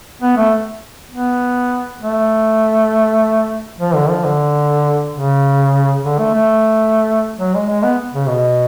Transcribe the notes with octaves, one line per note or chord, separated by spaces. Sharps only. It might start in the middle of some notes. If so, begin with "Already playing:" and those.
B3
A3
B3
A3
F3
D3
F3
D3
C#3
D3
A3
A3
F#3
G#3
G#3
B3
C#3
B2